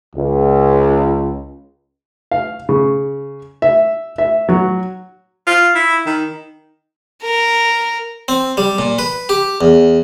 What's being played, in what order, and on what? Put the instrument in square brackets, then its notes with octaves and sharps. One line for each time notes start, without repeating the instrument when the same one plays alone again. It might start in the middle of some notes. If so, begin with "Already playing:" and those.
[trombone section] C#2
[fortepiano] F5
C#3
E5
E5
F#3
[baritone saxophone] F4
E4
D#3
[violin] A#4
[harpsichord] C4
G3
A#2
B4
G4
E2